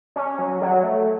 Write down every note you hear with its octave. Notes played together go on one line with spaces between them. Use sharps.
C#4
F#3
F#3
A3